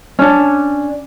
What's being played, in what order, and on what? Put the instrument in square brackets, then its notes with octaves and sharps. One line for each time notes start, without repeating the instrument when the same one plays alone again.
[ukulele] C#4 D4